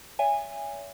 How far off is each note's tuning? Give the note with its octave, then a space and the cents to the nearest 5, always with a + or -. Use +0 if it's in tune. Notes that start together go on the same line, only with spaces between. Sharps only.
C#5 +40 E5 +25 G#5 -20